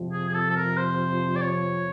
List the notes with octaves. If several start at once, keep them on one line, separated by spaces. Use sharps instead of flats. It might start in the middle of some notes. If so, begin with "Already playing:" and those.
Already playing: F2 C3 F3
G#4
G#4
A4
A4
A#4
C5
D5
C#5